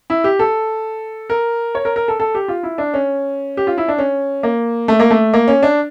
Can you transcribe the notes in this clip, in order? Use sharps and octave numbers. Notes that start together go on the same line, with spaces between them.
E4
G4
A4
A#4
C#5
A#4
A#4
A4
A4
G4
F4
E4
D4
C#4
G4
F4
E4
D4
C#4
A#3
A3
A#3
A3
A#3
C#4
D4